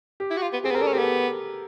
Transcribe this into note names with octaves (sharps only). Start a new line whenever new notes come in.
G4
E4
F#4
F4
B3
C4 G#4
B3
C4 A#4
D4 A4
C#4
B3 C4 G4